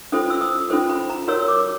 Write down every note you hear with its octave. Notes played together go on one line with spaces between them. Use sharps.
C#4 F4 A4 C5 D#6
E6
D#6
C#4 F4 A4 C5 D#6
B5
A#5
F#4 A#4 C#5 E6
D6